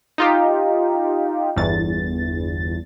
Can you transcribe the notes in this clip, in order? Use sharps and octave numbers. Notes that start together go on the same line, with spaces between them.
D#4 F4 G4
G1 E2 A6